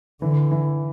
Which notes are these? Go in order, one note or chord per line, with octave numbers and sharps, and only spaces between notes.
D3 E3
E3